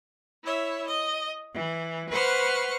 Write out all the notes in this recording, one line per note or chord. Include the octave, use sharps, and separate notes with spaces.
E4 C#5 E5
D#5
E3
B4 C5 F#5 C#6 F6